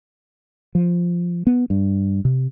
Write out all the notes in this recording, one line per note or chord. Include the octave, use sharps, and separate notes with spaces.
F3
B3
G2
C3